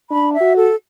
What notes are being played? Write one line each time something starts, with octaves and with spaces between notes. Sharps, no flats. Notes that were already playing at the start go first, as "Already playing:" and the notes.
D4 B5
E5
F#4
A4